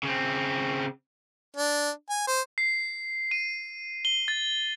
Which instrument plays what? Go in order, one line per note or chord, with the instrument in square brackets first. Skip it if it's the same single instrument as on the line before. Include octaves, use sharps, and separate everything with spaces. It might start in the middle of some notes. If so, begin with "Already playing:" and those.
[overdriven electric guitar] C#3 C4
[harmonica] D4
G#5
C5
[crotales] C7
D#7
G7
A6